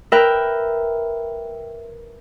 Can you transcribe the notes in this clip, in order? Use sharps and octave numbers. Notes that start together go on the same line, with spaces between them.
A#4 B4 E5 G5